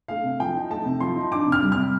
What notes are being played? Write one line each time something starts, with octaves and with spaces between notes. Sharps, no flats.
A3 F5
C3
F3 G5
D#4
A3 A5
C3
F3 C6
D#4
D4 D6
C3
F6
G3
C3 F6